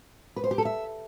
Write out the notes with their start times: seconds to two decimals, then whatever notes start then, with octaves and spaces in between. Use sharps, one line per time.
0.36 B4
0.44 C5
0.51 G4
0.58 A4
0.65 E5